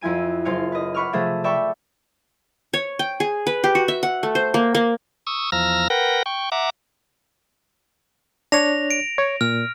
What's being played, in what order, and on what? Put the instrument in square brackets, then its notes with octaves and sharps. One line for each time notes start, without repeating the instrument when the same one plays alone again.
[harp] F2 F3 E4 G#5 D#7
F#1 F4 C5 F5 G#5 C#7
B4 D#5
F#5 B5 C#6 D6 F6
C3 F3 A3 G#4 A4 E5
D5 E5 G5 A5 B5 C#6
[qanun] C#5
G5
G#4
B4
G4
F#4
E5
F#5
A3
C5
A#3
A#3
[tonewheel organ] C#6 D#6 E6
E2 F3 A#5 E6 F6 A#6
A#4 B4 F#5 G5 A#6
G5 C#6
E5 F#5 A#5 D6
[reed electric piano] D4 C#5 [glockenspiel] A#6 F7
[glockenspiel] D7
[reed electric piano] C#5
[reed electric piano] A#2 [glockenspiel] F6